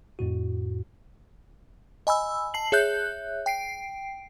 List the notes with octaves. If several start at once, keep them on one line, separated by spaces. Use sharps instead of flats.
F2 A2 F#4
D#5 G#5 B5 E6
A5 C7 F#7
G#4 C#5 E5 F#6 G6
G5 C7 D7